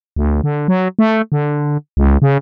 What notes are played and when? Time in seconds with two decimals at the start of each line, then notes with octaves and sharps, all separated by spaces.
0.16 D2
0.44 D3
0.68 F#3
0.99 A3
1.32 D3
1.97 C#2
2.22 C#3